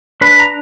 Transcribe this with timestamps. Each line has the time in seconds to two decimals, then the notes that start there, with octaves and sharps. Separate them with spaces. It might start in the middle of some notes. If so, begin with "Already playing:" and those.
0.21 D4 B4 B5
0.40 A#5